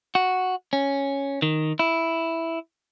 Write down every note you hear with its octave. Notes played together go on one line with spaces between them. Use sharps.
F#4
C#4
D#3
E4